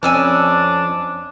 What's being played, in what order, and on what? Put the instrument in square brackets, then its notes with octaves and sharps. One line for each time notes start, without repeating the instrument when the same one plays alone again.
[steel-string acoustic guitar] F2 C#4 [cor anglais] D4 [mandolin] G#5 E6 F6